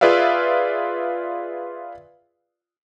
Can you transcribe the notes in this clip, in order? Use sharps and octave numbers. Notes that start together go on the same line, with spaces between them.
F4 G#4 B4 D5 E5 F5